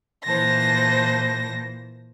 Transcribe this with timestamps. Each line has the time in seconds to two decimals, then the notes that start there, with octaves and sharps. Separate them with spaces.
0.24 A#2 E3 C5 A5 A#6